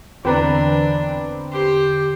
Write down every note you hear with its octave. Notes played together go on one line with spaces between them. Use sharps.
E2 D3 E3 C4 D4 B4 A#5
G4 C5